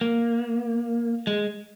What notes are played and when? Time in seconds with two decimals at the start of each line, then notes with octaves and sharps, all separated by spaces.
0.01 A#3
1.27 G#3